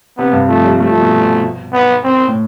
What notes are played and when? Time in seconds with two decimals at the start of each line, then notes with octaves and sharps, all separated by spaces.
0.18 C3 B3
0.33 G2
0.48 F3 A3
0.65 G3
0.79 G3 A3
0.90 F3
1.01 B2
1.73 B3
2.04 C4
2.28 A2